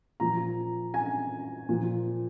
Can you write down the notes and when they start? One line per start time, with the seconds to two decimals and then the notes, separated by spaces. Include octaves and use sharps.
0.20 A#2 F3 A#5
0.94 G#5
1.69 A#2 F3